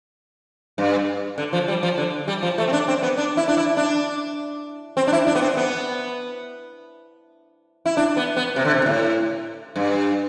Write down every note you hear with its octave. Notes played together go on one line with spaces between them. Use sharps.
G2
D3
F3
G3
F3
D3
G3
F3
A3
C4
D4
C4
B3
D4
E4
D4
E4
D4
C4
D4
E4
D4
B3
C4
B3
E4
D4
B3
B3
C3
D3
C3
B2
A2
G2